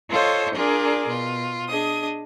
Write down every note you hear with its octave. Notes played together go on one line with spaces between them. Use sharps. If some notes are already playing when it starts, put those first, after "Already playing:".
F4 A4 C5 C#5 D#5
D4 F4 G#4 A#4 D5
B2 F4
D4 G#4 D#5 D#6